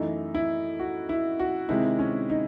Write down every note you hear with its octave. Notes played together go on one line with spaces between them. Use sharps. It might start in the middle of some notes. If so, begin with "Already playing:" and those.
Already playing: F#2 E3 A3 D#4
E4
F#4
E4
F#4
C3 D#3 G#3 C4 E4
C#4
D#4